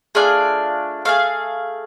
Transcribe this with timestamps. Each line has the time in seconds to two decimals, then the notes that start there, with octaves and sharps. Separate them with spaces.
0.15 A3 D4 F4 G#4 D5
1.05 A3 D4 G#4 F5